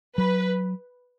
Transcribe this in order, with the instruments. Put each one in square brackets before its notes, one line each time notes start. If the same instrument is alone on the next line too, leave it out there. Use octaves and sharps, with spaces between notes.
[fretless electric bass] F#3 [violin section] B4